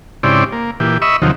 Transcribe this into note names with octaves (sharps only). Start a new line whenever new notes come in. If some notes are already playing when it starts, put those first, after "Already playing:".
G#2 C#3 C4 E4 G4 D5
A#3
A#2 E3 G4
D#5 E5 B5 C#6 E6
D#2 C3 D#3 F3 F#3